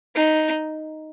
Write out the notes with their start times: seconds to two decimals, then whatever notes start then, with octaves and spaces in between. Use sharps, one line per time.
0.15 D#4